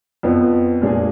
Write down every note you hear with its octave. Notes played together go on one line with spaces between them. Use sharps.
F2 F3 B3
A#2 G#3 D4 G#4